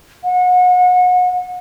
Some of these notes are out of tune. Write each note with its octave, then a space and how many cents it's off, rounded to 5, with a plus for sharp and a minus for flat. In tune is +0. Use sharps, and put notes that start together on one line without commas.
F#5 -30